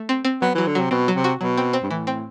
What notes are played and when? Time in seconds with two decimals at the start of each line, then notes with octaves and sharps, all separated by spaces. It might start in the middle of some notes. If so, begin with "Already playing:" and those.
Already playing: A3
0.09 C4
0.25 C4
0.42 F#3 B3
0.55 E3 F#3
0.67 D3
0.75 C3 F#3
0.91 B2 C4
1.08 F#3
1.16 C3
1.24 F#4
1.41 B2 F#3
1.58 C4
1.73 C4
1.83 G2
1.91 A2 E3
2.07 C4